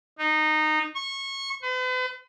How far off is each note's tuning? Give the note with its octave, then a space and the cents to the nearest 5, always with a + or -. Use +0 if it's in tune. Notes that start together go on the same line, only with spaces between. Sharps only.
D#4 -15
C#6 -25
B4 +45